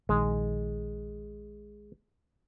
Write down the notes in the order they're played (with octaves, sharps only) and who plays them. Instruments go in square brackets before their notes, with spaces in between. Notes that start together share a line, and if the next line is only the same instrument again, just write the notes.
[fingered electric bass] A#1 D#3 [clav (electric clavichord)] G#3